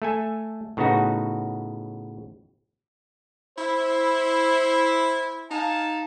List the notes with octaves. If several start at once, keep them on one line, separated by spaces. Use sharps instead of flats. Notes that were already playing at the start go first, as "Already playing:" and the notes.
A3 A4 G#5
A2 C#3 B3 D#4 F#4 F#5
E4 C5
D#4 F5 G#5 A5